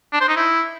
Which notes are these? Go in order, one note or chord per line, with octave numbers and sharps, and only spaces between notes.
D4
C5
D#4
E4